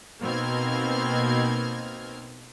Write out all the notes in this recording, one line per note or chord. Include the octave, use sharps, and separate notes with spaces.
B2 A#3 C4 D#4 F6 G#6